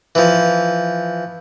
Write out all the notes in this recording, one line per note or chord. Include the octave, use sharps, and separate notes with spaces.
E3 F3